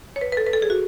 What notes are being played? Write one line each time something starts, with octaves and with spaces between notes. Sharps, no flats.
C#5
B4
B4
A4
B4
A4
G#4
F#4